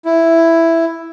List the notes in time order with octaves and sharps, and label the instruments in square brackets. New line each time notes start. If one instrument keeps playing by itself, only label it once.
[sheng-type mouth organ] E4